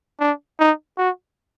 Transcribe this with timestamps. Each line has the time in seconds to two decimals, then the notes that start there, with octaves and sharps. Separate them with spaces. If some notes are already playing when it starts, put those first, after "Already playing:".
0.20 D4
0.59 D#4
0.98 F#4